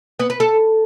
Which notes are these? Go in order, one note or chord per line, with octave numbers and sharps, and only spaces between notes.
B3
B4
A4